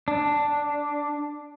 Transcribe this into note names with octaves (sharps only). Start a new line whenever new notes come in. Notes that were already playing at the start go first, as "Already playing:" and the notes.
D4